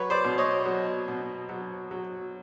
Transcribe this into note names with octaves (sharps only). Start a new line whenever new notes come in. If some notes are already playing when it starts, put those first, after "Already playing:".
Already playing: F#3 B4 C#5
C5 D5
B2
C#5 D#5
F#3
B2
F#3
F#3